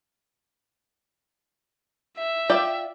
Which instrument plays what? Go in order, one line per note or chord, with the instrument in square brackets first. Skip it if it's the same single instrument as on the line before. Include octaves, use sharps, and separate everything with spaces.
[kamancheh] E5
[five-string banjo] F4 D5 G5